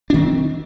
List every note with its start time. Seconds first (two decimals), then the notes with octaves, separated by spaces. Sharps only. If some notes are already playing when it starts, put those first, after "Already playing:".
0.10 D4
0.14 D#3
0.18 C4